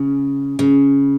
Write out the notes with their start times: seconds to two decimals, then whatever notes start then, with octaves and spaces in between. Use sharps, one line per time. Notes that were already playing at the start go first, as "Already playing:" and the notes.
Already playing: C#3
0.59 C#3